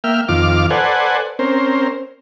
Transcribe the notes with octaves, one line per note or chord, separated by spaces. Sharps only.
A#3 E5 G5 F6
F2 D#3 F4 D6 F6
A4 B4 C5 D5 F#5 G#5
C4 C#4 A#4 C5